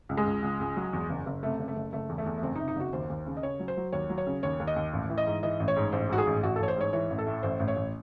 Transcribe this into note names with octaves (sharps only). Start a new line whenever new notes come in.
C#2
G#3
C#2
C#2
C#2
F#3
E2
F#1
F#1
C3 A3
F#1
A3
F#1
F#1 A3
E2
A3
E2
A3
F#1 C4
D#4
C3
D#4
F#1 F#4
D#2 C5
D#2
C#3
D#5
C#3 C#5
F#3
C5
F#3
D#2 C#5
F#3
C#5
C#3
D#2 C#5
D#2
D#5
D#2
A1
E3
D#5
G#2
E3 D#5
A1
C#5
G#2
A1 C5
G#2 F#4
G#4
A1
A1 F#4
A4
A1 C#5
C5
G#2 C#5
E3 C#5
A1
A4
A2
A1 C5
A1
C#5
A1